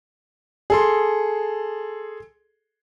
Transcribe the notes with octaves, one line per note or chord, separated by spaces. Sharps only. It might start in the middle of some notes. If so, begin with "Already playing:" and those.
G#4 A4 C6